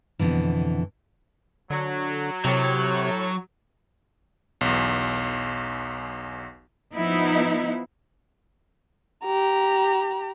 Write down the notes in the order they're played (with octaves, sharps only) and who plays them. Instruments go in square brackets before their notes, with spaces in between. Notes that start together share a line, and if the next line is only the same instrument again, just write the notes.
[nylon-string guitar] F2 G#2 B2 D3 E3
[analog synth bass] D3 [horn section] F#3
[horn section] A2 C#5 [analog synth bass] C3 [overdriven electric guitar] F#3
[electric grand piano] B1 E2
[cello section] F3 B3 D#4 E4
[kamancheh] G4 A#5